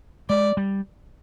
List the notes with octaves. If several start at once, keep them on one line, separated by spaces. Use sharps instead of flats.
G#3 D5
G3